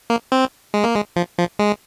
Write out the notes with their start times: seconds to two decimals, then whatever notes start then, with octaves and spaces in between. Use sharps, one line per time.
0.10 A#3
0.32 C4
0.74 G#3
0.84 A#3
0.95 G#3
1.16 F3
1.38 F3
1.59 G#3